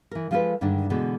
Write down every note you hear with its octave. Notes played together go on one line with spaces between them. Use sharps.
E3 A#4
F3 G#3 F4 G#4 A4 B4
G2 D3 D#3 G#3 D4
B2 D3 E3 G#3